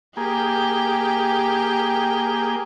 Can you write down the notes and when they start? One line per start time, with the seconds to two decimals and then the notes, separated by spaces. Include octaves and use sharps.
0.17 A#3 G4 G#4 G5